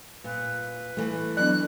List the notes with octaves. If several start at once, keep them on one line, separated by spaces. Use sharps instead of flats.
A#2 B4
E3 A3
F#3 B3 D4 F#6